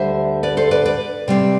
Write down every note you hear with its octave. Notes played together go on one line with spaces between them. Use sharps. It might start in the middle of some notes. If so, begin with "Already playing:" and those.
Already playing: D2 D3 G3 C5 E5
B4 D5
A4 C5
B4 D5
B4 D5
C3 G3 C4